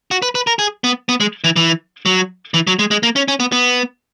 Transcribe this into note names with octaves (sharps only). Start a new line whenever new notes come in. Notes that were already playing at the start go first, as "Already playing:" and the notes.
F#4
B4
B4
A#4
G#4
B3
B3
G#3
E3
E3
F#3
E3
F#3
G#3
G#3
A#3
C#4
C#4
B3
B3